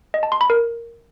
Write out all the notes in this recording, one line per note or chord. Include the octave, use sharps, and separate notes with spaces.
D#5
A5
C6
B5
A#4